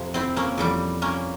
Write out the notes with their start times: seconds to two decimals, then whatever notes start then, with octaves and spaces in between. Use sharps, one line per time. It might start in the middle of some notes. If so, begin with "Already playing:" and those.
Already playing: F2 C3 F3
0.14 C4 E4
0.36 A#3 C#4
0.58 F2 E3 G3
1.02 A#3 C#4